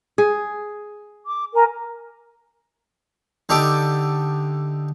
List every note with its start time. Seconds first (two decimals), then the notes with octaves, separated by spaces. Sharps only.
0.18 G#4
1.25 D6
1.53 A#4 G#5 A#5
3.49 D3 D#4 G4 A4 E5 D6